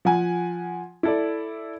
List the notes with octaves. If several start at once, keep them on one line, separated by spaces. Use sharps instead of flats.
F3 F#5 G#5
E4 A4 D5